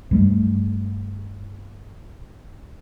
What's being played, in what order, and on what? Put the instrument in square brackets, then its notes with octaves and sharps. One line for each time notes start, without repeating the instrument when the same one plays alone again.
[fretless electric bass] G2 G3 A3